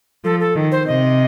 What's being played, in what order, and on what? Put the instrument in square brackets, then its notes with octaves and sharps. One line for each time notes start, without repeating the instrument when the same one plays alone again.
[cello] F3 [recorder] A4
[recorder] A4
[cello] D#3
[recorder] C5
[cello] C3 [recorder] D#5